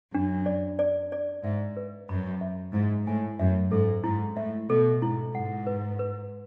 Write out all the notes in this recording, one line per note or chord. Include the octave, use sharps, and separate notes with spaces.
F#2 D4
D5
D5
D5
G#2 E5
B4
F#2 B5
E5
G#2 E4
A2 G#5
F#2 E5
G#2 A4
G#2 E4
A2 E5
B2 A4
G#2 E4
G#2 F#5
B4
B4